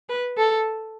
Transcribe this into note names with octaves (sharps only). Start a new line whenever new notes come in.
B4
A4